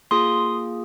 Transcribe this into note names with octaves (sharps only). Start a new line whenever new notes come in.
A#3 F4 G#4 C6 D#6